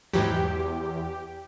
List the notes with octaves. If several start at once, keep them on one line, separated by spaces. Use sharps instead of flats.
E2 G#2 E3 F#3 G4